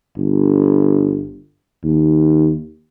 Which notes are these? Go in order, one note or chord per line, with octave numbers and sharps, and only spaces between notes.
G1
D#2